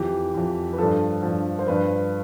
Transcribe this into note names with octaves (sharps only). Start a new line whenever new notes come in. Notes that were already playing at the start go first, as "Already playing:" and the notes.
Already playing: F2 E3 G4
F2 E3
B4
G2 F3 A4
G2 F3
C5
G2 F3 B4